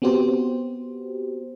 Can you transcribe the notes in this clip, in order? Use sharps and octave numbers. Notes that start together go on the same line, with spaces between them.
B3 C4 F#4 G4 C5